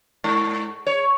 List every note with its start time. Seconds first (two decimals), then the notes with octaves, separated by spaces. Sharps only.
0.24 G#2
0.87 C#5